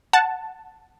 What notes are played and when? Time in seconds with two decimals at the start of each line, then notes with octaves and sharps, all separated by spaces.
0.13 F#5 A5